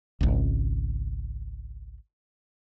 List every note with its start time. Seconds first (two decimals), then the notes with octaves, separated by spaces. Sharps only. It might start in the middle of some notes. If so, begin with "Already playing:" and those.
0.21 G#1 C#2